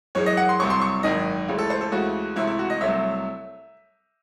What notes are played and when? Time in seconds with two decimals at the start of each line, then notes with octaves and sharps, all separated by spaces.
0.15 F#2 E3 G#3 C#5
0.26 D#5
0.37 F#5
0.49 C6
0.59 C2 C3 F#3 C#6
0.70 C6
0.81 C#6
1.03 G#1 F#2 D#3 D#5
1.48 C#2 C#3 E3 A3
1.58 A4
1.70 C5
1.81 A4
1.92 C#2 C#3 E3 A3 F#4
2.36 C#2 C3 E3 A3 E4
2.47 E4
2.59 F#4
2.70 D#5
2.80 C2 C3 F#3 A3 E5